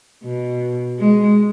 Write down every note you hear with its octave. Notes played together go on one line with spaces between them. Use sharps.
B2
G#3